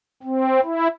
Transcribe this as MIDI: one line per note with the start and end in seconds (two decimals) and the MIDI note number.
0.23 0.60 60
0.63 0.88 64